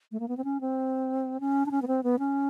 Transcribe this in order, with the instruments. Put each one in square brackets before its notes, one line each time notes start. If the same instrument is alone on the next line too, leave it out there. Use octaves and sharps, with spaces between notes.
[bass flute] A3
A#3
B3
C4
C#4
C4
C#4
D4
C#4
B3
C4
B3
C#4